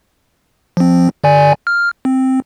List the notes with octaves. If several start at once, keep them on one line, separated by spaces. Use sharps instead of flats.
F3 C4
D3 D5 G#5
F6
C4